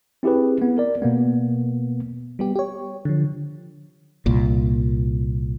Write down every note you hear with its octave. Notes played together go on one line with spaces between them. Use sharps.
C4 E4 G4 G#4 B4
B3
A#4 D5
B2 A#3 B3
G3 B3 G4
G4 C#5
D3 F3
C2 A#2